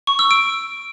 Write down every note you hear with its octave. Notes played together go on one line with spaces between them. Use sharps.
C#6
E6
D7